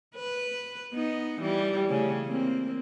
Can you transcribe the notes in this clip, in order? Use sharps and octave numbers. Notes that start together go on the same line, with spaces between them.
B4
B3 D#4
E3 G3
C#3 A3 C#4
A#3 C4